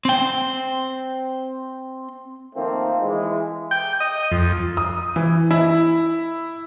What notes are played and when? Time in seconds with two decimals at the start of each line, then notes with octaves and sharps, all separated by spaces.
0.05 C4 G5
2.55 D#3 F3 A3 A#3 C4
3.00 E3 G#3
3.71 G5
4.00 D#5
4.32 F2
4.77 D#6
5.16 E3
5.51 E4